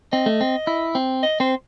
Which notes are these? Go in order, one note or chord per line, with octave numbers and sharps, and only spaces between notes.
C4 D#5
A3
C4
E4
C4
D#5
C4 C5